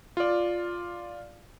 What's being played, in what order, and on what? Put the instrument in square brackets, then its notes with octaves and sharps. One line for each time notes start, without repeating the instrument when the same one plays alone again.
[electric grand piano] F4 D5